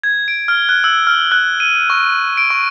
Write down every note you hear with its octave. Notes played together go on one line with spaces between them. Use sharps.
G#6
D7
F6
F#6
E6
F6
F#6
D#7
C#6
D7
C#6